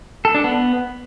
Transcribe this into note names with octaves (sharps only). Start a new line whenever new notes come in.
A4
D4
B3